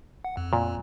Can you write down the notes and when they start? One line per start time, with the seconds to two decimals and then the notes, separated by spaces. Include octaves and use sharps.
0.25 F#5
0.37 F2
0.53 A#2